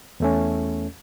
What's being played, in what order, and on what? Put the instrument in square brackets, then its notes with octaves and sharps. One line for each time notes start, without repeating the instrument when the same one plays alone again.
[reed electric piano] E2 A3 C#4